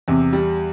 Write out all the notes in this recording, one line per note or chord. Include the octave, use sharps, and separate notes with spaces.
E2 C3
G3